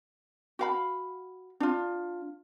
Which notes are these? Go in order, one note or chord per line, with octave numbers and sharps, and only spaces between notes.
F#4 F5 B5
D4 F4